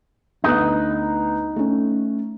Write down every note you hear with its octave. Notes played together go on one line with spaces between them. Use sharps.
D2 B3 D#4 F#6
A3 C#4